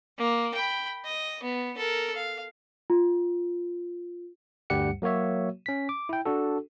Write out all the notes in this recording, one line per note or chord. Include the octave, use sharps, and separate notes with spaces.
A#3
G5 B5
D#5
B3
A4 A#4
F5
F4
D2 G2 G3 G4 F#5 C#7
F#3 A#3 F#4 C#5 E5
C#4 B6
D6
E4 G5
D4 F#4 A4